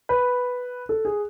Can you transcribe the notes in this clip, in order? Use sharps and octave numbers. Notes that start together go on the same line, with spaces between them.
B4
A4
G#4